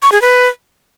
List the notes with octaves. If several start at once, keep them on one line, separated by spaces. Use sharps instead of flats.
C#6
G#4
B4